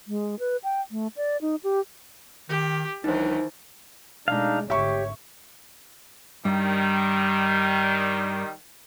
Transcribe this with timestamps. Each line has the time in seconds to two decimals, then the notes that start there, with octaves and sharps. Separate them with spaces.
0.07 G#3
0.39 B4
0.64 G5
0.91 A3
1.16 D5
1.41 D#4
1.64 G4
2.49 D#3 G4
3.04 C#2 D#3 E3 F#3 D4 D#4 C5
4.28 B2 G#3 A3 D4 D#4 F5
4.70 G#1 D3 G4 C#5 E5 C#6
6.45 G2 D#3 G3